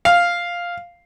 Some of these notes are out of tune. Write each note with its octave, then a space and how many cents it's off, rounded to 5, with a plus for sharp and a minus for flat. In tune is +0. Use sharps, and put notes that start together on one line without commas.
F5 +0